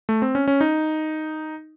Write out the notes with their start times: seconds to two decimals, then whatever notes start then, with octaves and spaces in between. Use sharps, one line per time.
0.09 A3
0.22 C4
0.35 C#4
0.48 C#4
0.61 D#4